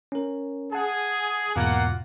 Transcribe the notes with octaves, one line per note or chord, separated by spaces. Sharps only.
C#4 A#4
G#4 F#5 A5
E2 G#2 B2 A#3 F4 F#5